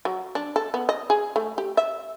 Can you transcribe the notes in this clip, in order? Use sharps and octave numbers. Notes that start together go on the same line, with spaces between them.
F#3
D4
A4
B3
D#5
G#4
A3
G4
E5